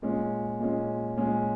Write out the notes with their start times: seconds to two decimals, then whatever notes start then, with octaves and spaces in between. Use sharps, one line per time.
0.02 A#2 G#3 C#4
0.60 A#2 G#3 C#4
1.17 A#2 G#3 C#4